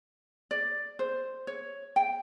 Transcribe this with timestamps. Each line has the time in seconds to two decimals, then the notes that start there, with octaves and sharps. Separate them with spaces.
0.51 D5
0.99 C5
1.47 C#5
1.96 G5